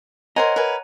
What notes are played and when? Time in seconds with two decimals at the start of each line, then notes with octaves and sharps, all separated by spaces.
0.36 A#4 C5 C#5 D#5 F#5 G#5 A#5
0.56 A#4 B4 G#5